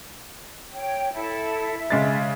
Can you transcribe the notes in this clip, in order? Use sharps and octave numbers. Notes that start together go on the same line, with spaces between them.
C#5 G5
E4 A4
E5
C#3 G#3 A6